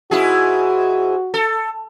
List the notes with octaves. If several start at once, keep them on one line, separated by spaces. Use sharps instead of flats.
G#2 E4 F#4 G#4
A4